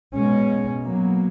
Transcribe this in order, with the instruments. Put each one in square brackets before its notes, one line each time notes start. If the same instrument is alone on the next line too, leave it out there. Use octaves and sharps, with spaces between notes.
[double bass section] B2 G#3 C#4
B2 F#3 A#3